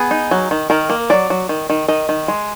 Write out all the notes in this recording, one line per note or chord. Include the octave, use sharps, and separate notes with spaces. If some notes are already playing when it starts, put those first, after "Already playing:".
Already playing: B3 G#4
D#4
F#3
D#3
D#3 A#4
A#3
F#3 D5
F#3
D#3
D#3
D#3 D#5
D#3
G#3